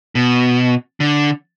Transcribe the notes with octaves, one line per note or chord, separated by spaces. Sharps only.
B2
D3